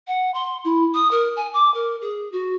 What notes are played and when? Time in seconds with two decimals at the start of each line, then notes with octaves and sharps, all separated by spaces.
0.07 F#5
0.34 C6
0.64 E4
0.94 D#6
1.11 A#4
1.36 G#5
1.53 D6
1.74 A#4
2.01 G#4
2.32 F#4